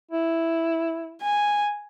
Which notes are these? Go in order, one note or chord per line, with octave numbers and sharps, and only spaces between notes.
E4
G#5